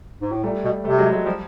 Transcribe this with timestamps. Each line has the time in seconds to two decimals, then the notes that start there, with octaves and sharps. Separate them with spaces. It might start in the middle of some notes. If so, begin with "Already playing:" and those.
0.21 G#2
0.32 A2
0.43 A#2 G3 A3
0.64 B2
0.84 C3 G3 A3
0.98 F#3 G#3
1.12 F#3 G#3
1.25 F3 G3